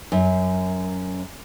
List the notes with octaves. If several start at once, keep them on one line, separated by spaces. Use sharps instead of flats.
F#2